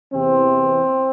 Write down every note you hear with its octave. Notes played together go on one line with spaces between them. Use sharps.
E2 C3 E3 C4